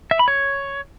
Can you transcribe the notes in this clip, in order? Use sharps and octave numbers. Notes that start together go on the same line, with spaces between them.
E5
B5
C#5